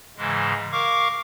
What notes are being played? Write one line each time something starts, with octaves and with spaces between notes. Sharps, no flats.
G#2 C#3 E3 G#3
A#4 F5 C#6 D6